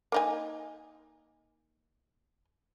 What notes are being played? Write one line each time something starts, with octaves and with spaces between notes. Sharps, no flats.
A#3 D#4 G#5